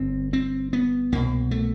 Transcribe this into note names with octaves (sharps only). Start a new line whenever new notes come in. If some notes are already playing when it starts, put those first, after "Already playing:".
Already playing: G1 G2 D3 C4
C4
B3
C2 B2 A#3
A3